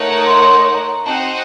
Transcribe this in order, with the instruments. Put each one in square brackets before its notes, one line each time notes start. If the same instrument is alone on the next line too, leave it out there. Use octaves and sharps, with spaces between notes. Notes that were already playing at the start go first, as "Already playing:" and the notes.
Already playing: [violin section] A3 D#4 A#4 C#5 F#5
[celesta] A#5
C6
C6
A#5
[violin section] C4 D#4 F#4 C5 F#5 [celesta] A5